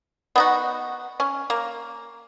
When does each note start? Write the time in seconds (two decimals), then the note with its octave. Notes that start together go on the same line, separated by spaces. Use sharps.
0.36 B3 D#4 F#4
1.20 C#4
1.50 A#3